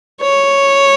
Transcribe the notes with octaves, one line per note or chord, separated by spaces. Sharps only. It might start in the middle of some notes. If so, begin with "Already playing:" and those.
C#5